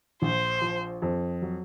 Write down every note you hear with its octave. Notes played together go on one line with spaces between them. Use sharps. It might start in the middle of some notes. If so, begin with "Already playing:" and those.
A#1 C5
F3
F2
F#3